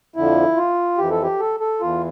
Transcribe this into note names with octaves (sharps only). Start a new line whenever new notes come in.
F2 D3 F3 E4
F4
F2 E3 G4
A4
G4
A4
A4
E2 E3 F4